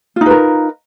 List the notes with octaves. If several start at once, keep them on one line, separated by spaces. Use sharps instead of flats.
D#4 F4 A#4 B4